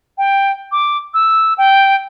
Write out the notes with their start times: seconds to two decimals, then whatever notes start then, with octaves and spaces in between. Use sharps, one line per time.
0.18 G5
0.72 D6
1.14 E6
1.58 G5